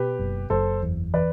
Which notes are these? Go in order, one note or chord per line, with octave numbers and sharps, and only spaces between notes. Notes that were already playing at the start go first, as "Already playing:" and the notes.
Already playing: B2 G4 B4
F#1
F#1 A4 C5
E2
E3 B4 D5